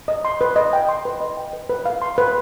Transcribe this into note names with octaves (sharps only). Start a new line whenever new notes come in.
D#5
C6
B4
D#5
G5
C6
B4
D#5
G5
B4
B4
F5
C6
B4